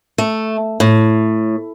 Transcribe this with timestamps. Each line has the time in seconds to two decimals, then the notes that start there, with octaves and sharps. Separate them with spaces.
0.18 A3
0.80 A2